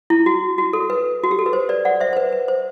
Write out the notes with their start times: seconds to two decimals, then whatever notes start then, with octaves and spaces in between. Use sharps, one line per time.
0.10 E4
0.26 F#4
0.58 F#4
0.73 A4
0.90 B4
1.24 F#4
1.31 G4
1.39 A4
1.46 B4
1.53 C5
1.69 B4 D5
1.85 D5 F#5
2.00 C5 E5
2.13 C5
2.17 B4
2.33 B4
2.48 C5